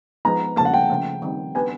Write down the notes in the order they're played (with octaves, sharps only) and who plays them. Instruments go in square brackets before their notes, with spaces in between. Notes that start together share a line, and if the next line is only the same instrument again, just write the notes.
[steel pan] F3 G#3 B3 D#4 [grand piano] A#5
[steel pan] C#3 F3 A#3 [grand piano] A5
[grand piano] F#5
G5
[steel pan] C#3 F3 A3
D#3 G3 C4
[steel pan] B3 D4 G4 B4 [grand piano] G#5